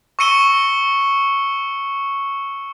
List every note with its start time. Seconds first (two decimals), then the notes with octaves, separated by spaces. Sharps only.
0.19 C#6 E6 C#7 D#7 G7